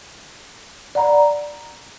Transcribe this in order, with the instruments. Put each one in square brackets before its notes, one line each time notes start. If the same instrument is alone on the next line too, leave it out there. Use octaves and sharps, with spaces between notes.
[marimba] D5 F#5 A#5 B5